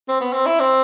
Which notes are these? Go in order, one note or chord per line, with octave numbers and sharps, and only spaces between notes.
C4
B3
C4
E4
C4